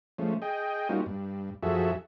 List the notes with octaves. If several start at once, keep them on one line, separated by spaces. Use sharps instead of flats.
F3 G#3 A3 C#4
G#4 D#5 G5
G3 A#3 C#4 D#4 F4 F#4
G2
F#2 F3 F#4 G#4 A4 E5